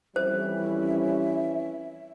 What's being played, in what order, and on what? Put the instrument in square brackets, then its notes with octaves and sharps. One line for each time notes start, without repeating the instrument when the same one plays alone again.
[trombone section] F2 G3 [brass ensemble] E3 C#4 [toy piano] C5 [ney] E5